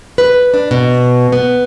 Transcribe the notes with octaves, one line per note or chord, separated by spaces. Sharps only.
B4
D4
B2
B3